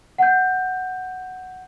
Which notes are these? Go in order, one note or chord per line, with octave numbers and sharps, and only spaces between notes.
F#5 G6